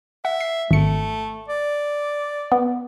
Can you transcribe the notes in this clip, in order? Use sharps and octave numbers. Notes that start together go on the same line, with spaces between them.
E5 F#5
C7
G#1 A3 C#7
D5
B3